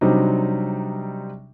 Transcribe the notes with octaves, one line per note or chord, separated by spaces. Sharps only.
C3 F#3 G3 C4 D4 D#4